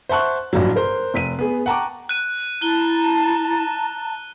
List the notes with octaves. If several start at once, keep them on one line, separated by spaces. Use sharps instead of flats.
C5 E5 F#5 A5 C#6 F#6
A1 G2 A#2 F3 F#3
A#4 C5
F1 B6 D#7
B3 G#4
F#5 G5 A5 A#5 C#6 D6
F#6 D#7
E4 A5 A#5 F#6 G7